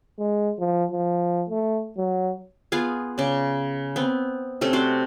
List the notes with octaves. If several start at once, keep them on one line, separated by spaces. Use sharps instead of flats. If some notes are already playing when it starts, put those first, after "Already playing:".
G#3
F3
F3
A3
F#3
B3 F4 G#4 F5
C#3 D5
B3 C4
C3 A3 C#4 A4
F#4 C5 D5